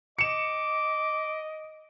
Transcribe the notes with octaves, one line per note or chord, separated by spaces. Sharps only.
D#5 D6 C#7 E7